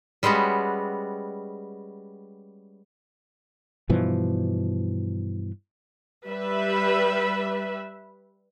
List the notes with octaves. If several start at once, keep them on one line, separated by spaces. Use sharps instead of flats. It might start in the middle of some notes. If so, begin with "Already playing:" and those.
G3 G#3 B3 C#4 F#4
G2 B2 E3 F3
G3 B4 E5